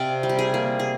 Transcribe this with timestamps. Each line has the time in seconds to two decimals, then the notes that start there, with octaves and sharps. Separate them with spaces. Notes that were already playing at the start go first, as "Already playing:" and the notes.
Already playing: C3 D5 F5
0.23 G3
0.29 G4
0.39 G#4
0.54 A#3
0.79 G#4